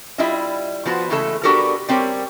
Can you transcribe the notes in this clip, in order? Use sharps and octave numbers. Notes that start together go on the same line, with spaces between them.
G3 E4 F4 D#5 E5
F3 B3 F#4 C5
C#3 E3 G#3 A3 A4
B3 D4 F#4 G4 A4 A#4
G3 C4 G4 A#4 C#5